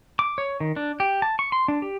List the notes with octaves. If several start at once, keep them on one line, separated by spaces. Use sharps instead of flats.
D6
C#5
D#3
D4
G4
A5
C#6
C6
D4
G4